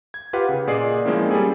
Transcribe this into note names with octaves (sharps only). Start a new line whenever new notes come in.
G#6
F4 G4 B4 F5 F#5
C#3
A#2 G#4 D5 D#5 C7
F3 G#3 A#3 C4 C#4 E4
G3 C#4 G#4 A4